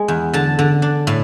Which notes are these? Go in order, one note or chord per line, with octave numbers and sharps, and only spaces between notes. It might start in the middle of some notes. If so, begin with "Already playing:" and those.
Already playing: G#3
E2
D3 A5
D3
D4
A2